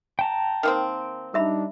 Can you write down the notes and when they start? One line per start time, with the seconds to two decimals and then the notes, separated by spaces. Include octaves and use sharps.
0.19 G5 A5 A#5
0.63 D#3 A#3 C4
1.34 G3 D4 D#4 A#4 E5 B5